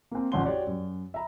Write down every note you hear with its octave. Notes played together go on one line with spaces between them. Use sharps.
A#3 C4
A1 F2 C#4 F#5 C6 G7
F#4 G4 C#5 D5
F#2
E5 A#5 B5